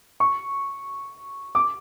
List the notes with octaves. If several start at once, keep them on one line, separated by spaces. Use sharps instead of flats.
C#6
D6